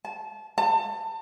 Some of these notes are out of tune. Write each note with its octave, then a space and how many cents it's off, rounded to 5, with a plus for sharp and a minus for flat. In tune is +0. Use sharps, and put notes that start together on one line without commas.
A5 -25
A5 +25